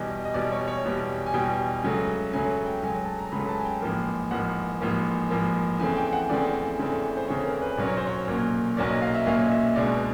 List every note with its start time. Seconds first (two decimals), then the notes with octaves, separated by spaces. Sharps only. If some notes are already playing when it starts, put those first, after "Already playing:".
Already playing: E2 B2 G3 D#5
0.25 D#5
0.34 E2 B2 G3 D5
0.52 C#5
0.68 C#5
0.84 E2 B2 G3
1.26 G#5
1.33 E2 B2 G3 G5
1.84 C#2 C#3 F#3 A3
2.33 C#2 C#3 F#3 A3 G#5
2.66 G5
2.82 C#2 C#3 F#3 A3 G#5
3.05 A5
3.19 A#5
3.32 C#2 C#3 F#3 A3 B5
3.49 A5
3.58 G#5
3.65 G5
3.81 A1 G#2 F3 A#3
4.31 A1 G#2 F3 A#3 F#5
4.80 A1 G#2 F3 A#3
5.30 A1 G#2 F3 A#3
5.79 E2 C#3 E3 A3 C4 G#5
5.97 G5
6.07 G5
6.13 F#5
6.30 E2 C#3 E3 A3 C4 D5
6.79 E2 C#3 E3 A3 C4
7.17 C5
7.28 E2 C#3 E3 A3 C4 C#5
7.44 A#4
7.61 B4
7.77 B1 A#2 F#3 A#3 C#4 D5
7.87 C#5
7.97 C5
8.07 C#5
8.27 B1 A#2 F#3 A#3 C#4
8.77 B1 A#2 F#3 A#3 C#4 D5
8.90 D#5
9.02 F5
9.14 E5
9.26 B1 A#2 F#3 A#3 C#4 F5
9.47 D#5
9.52 E5
9.76 C#2 B2 G#3 B3 D4 D5